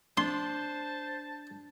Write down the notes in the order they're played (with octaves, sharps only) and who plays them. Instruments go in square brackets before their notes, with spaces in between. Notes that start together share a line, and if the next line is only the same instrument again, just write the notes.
[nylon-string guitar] D4 [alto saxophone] C5 [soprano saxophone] A5 [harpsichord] C6